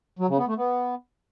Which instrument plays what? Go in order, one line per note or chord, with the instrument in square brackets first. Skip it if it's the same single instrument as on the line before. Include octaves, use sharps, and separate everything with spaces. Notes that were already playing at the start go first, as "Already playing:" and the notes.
[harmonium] F#3
C#3
B3
A3
B3